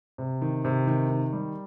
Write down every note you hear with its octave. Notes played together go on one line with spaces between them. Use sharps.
C3
D#3
C3
D#3
D#3
G3